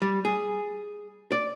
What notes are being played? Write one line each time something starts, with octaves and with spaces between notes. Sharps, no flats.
G3
G#4
D5